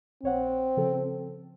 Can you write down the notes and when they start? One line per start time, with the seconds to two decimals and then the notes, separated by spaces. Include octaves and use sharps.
0.23 A#1 C4 C#5 F#5
0.77 C#3 F3 A4